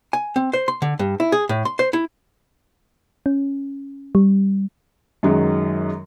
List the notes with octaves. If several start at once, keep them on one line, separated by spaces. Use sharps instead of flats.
G#5
C4
C5
C6
D3
G2
E4
G#4
A2
C6
C5
E4
C#4
G3
F#2 D#3 F#3 G#3